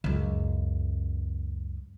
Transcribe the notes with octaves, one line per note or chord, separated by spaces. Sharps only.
C#2 F#2